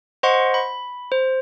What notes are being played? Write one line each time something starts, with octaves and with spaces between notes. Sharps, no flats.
C5 D#5 F#5 C6 C#6
B5
C5